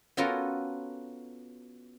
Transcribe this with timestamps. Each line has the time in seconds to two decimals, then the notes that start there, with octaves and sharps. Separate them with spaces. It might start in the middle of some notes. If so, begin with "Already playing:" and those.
0.17 B3 C#4 F4 F#4 A4 A#4